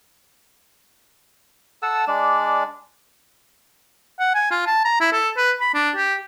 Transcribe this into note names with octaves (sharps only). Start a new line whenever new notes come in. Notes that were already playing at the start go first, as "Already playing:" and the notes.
A4 F#5 A5 E6
G#3 D4 D5
F#5
G#5
F4
A5
A#5
E4
A4
B4
B5
D4
G4